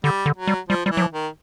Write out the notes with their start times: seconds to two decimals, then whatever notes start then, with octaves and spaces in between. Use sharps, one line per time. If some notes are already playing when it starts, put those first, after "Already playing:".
0.04 D3 G3
0.26 D3
0.36 F#3
0.47 G3
0.69 F3 G3
0.85 F3 G3
0.90 E3
0.97 F#3
1.01 F3
1.13 D#3